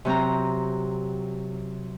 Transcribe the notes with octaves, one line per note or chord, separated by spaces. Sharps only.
C3 F#3 C4 A#5